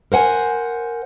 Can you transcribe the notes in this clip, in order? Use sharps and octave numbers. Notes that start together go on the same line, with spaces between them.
A#4 C5 F#5 G#5